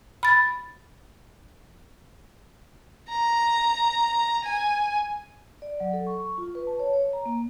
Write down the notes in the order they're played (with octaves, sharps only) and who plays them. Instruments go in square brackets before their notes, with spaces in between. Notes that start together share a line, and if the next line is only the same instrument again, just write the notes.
[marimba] B5 A6
[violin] A#5
G#5
[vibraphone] D5
F#3
A4
C#6
F4
B4
A5
C#5
C#5
A#5
A#3